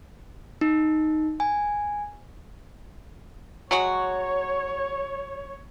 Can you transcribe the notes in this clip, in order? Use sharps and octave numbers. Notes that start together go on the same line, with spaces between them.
D#4
G#5
F#3 G#3 F#4 C#5